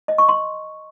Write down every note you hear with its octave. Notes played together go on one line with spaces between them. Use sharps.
D#5
C#6
C6